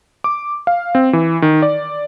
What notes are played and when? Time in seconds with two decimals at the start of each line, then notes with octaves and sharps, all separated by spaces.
0.24 D6
0.67 F5
0.95 C4
1.13 E3
1.42 D#3
1.62 D5